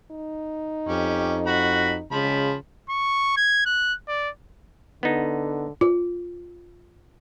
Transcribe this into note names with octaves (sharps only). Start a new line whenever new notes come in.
D#4
F2 C#4 G4
F#4 B5
C#3 F3 G#3 B5
C#6
G#6
F#6
D5
D3 B3 D#4
F4